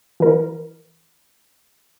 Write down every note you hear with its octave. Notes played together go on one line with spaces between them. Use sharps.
E3 A#4